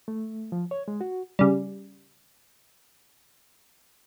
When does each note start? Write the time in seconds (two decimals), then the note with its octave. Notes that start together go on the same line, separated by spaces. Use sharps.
0.08 A3
0.52 F3
0.71 C#5
0.88 G#3
1.01 F#4
1.39 C#3 G3